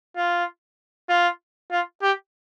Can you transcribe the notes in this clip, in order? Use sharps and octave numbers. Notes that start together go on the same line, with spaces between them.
F4
F4
F4
G4